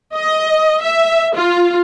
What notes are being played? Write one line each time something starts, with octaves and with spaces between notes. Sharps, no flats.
D#5
E5
F4